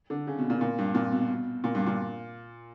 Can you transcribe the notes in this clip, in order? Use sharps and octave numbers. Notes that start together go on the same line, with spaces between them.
D3
C#3
B2
A#2
A#2
G2
A#2
B2
A#2
G2
A#2